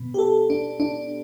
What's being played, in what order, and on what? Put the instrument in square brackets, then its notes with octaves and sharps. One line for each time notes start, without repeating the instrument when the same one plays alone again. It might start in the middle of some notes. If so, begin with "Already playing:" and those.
Already playing: [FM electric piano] B2 B3
G4
A4
D4
D4